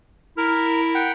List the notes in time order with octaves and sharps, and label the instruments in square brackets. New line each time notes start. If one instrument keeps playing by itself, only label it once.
[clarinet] E4 [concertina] A#4 F6
[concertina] F#5 G5